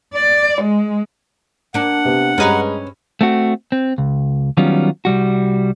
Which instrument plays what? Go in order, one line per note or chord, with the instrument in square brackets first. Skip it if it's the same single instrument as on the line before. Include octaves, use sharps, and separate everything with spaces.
[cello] D5
G#3
[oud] A#3 D4 [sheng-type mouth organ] F#5
[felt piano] C3 B3
[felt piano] G2 G4 [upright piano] G#3 D#5 A#5 [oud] C#4 B4
[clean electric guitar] A3 C4 F#4
C4
C#2
D#3 F#3 G3 B3 C#4 F4
C2 G3 F#4